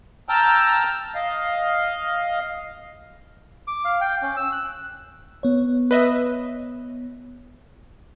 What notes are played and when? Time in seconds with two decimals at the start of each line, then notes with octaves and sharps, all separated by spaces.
0.29 G5 A5 A#5 E6 F6
1.15 D#5 F5
3.68 D6
3.85 F5
4.01 G5
4.22 C#4
4.36 E6
4.52 F#6
5.43 B3 C#5
5.91 B4 D#5 E5